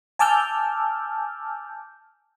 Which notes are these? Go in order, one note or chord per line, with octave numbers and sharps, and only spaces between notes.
G#5 A5 D6 E6 F6 G6